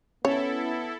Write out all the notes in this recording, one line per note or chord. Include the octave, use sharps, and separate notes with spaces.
B3 C#4 E4 A4 C#5